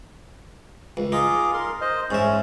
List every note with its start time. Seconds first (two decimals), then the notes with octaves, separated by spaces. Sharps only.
0.97 C#2
1.12 D#4 F4 G#4 D6
1.54 A#4 C6
1.81 C5 D#5
2.11 G#2 C#4 E5